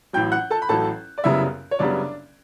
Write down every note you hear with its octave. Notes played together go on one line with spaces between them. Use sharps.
A1 A2 F#3 G5 G6
F#5 F#6
A4 A5
B5
A1 A2 F#3 A4 A5
D5
F#1 F#2 C#3 G3 B3 E4 E5
C#5
F#1 F#2 C#3 G3 B3 D4 D5